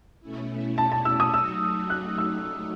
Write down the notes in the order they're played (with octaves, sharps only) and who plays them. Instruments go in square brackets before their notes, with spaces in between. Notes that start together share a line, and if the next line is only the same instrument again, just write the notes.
[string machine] B2 A3 C#4 E4
[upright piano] A5
A5
E6
D#6
[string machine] F#3 A3 D#4 F#4 [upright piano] E6
[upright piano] F#6
E6